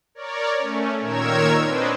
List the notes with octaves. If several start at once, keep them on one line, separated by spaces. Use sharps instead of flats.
A#4 C#5 D5
A3 C#4
A#2 D#3 A#4 C#5 E6 G#6
C4 D4 B4 C5 D#5